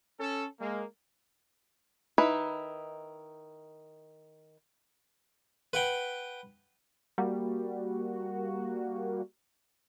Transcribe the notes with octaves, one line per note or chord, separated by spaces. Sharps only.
C#4 A4
G#3 A#3
D#3 D#4 E4 B4
B4 F#5 G5
G3 A#3 F#4